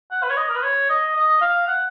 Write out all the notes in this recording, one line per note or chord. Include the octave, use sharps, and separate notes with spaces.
F#5
B4
C#5
D#5
A#4
B4
C#5
D#5
D#5
F5
F#5